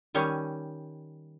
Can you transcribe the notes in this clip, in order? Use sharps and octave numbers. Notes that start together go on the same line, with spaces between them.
D#3 G3 C#4 G#5